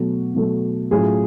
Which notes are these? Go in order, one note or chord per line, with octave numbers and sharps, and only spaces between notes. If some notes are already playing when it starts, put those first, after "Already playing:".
Already playing: B2 F#3 A3
B2 F#3 A3
A2 F#3 C#4 F4 G#4